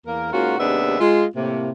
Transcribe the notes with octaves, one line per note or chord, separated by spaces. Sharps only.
E2 A#3 A#4
G#2 A#3 C#4 F4 F#4
D#2 C3 G#3 B3 D4 E5
G#3 F4
A2 C3 A#3